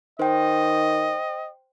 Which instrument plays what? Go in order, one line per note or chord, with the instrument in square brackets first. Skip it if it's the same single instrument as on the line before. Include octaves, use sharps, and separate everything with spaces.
[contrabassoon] D#3 [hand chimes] C5 G5 [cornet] D#5